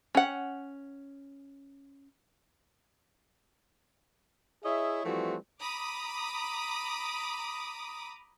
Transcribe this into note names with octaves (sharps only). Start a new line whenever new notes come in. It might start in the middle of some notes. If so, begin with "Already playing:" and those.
C#4 F#5
E4 G#4 C#5 D#5 E5
E3 F3 G3 A3 C4 F#4
A#5 B5 D6 D#6